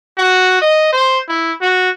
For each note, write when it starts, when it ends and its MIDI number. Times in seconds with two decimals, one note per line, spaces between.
0.18 0.60 66
0.61 0.89 75
0.93 1.19 72
1.28 1.52 64
1.61 1.90 66